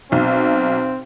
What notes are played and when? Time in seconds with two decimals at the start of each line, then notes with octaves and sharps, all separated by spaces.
0.12 B1 C4